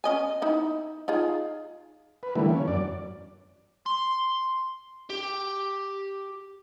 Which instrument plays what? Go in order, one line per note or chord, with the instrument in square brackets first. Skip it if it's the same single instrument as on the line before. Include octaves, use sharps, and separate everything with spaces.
[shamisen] C#4 D#5 G#5
D#4 E4
D#4 F4 G#4
[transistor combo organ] B4
D3 E3 G3 A3 A#3
C#4
F#2 D5
[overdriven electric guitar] C6
G4